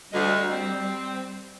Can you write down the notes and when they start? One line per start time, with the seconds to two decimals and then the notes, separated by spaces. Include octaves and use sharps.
0.12 D2 G3 D#5
0.50 C4